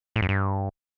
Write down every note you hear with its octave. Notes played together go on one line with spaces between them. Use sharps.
A2
F#2
G2